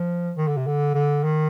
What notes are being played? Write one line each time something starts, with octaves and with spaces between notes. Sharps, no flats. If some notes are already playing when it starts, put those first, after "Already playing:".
Already playing: F3
D#3
D3
C3
D3
D3
D#3